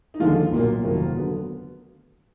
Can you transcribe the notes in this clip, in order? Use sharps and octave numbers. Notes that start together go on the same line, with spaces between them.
D#4
D#2 D3 F3 G#3 F4
B1 A#2 F#3 A#3
F1 F2 D#3 F#3 A#3
D3 F#3 B3